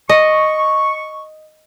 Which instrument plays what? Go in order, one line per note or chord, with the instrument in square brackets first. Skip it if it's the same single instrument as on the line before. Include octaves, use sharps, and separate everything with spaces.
[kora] D#5 [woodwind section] C#6